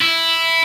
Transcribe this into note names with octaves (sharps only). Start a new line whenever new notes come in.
E4